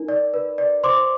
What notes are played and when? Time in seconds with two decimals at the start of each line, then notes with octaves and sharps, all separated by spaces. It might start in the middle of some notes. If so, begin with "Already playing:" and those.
Already playing: D#4 A#4
0.09 D5
0.34 B4
0.58 D5
0.83 C5 C6 D6